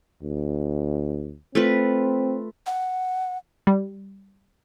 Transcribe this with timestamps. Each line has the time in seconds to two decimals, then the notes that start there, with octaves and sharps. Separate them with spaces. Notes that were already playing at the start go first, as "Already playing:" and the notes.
0.22 D2
1.55 A3 C4 F4 B4
2.66 F#5
3.67 G3